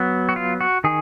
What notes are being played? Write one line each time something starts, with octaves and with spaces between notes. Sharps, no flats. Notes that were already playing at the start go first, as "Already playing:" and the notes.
Already playing: F#3 B3
F#4
F4
F#4
D#3 G#4